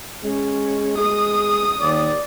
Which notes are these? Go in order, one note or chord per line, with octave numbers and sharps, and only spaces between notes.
G#3 C#4
G#3 D#6
D#2 D5